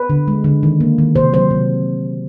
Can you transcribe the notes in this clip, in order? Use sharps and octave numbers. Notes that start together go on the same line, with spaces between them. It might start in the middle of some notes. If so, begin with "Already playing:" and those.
Already playing: B4
D3
G#3
D3
D#3
A#3
D#3
C3 C5
F#3 C5
C3